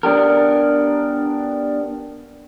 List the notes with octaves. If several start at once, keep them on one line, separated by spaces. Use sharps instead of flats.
B3 D4 G4 A#4